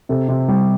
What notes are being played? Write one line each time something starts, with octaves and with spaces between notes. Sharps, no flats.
C3 A4
C3
G3 G4